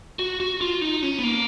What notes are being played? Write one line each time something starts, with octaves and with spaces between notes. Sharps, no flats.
F#4
F#4
F4
D#4
C#4
B3
A#3